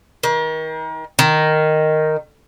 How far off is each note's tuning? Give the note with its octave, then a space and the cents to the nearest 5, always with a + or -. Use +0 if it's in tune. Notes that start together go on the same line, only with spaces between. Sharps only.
D#3 +35
D#3 -5